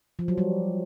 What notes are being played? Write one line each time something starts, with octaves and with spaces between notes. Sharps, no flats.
F3
F#3
G3